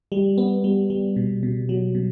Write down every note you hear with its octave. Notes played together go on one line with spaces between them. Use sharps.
G3
B3
G3
G3
B2
B2
F#3
B2